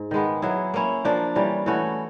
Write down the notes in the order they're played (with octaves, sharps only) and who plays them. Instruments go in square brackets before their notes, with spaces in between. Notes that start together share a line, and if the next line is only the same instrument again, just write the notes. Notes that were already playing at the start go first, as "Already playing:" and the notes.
Already playing: [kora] G#2
D#3 G#3 B3
F#3 B3 E4 G#4
A#3 C#4 E4
F3 A#3 D4
E3 G3 A#3 C#4
E3 A3 C#4 F#4